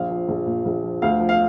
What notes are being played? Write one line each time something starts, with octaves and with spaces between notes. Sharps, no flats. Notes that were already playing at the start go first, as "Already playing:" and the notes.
Already playing: A#1 F5
F3
A#1
A#2
A#1
F3
D2 F5
F3
F5